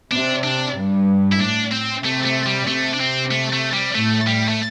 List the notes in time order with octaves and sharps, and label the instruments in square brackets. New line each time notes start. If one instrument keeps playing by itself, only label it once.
[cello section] C3 [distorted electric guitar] D4
[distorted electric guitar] D4
[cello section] G2
[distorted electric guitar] E4
[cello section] A2 [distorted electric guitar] D4
[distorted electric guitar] C4
[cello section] C3 [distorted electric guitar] A3
[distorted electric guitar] A3
G3
[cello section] C3 [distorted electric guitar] A3
[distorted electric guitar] D4
C4
A3
A3
G3
[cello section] A2 [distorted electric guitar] A3
[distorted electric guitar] G3
A3